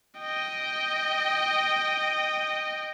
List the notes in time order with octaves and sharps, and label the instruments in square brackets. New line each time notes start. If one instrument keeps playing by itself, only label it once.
[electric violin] D#5 G5